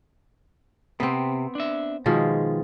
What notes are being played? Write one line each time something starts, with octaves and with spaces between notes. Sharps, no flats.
C3 B3 C4
D4 E5
B2 D#3 F3 G#3